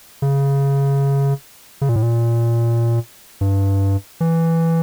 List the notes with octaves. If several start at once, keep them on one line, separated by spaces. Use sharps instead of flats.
C#3
C#3
A#2
A2
A#2
G2
E3